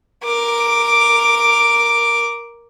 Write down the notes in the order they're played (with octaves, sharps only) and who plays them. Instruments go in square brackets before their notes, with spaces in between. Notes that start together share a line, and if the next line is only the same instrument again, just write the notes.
[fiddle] A#4 D6